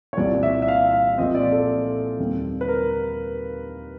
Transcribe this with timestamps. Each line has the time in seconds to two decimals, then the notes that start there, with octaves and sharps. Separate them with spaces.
0.13 C#5
0.17 C2 A#2 G3 C4 D5
0.43 E5
0.62 E5
0.68 F5
0.93 F5
1.18 A#2 F3 G#3 C4 D#5
1.35 D5
1.52 A4
2.19 D#2 D3 G3 C4
2.61 B4
2.68 A#4